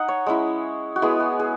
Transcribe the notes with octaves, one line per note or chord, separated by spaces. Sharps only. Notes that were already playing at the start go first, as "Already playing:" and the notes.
Already playing: D#4 D#5 F#5
C#5
G#3 C#4 E4
F#4
G#3 B3 E4 G#4
F#4
G#4